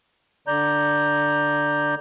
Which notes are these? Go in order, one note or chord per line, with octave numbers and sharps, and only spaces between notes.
D3 D5 A#5 G6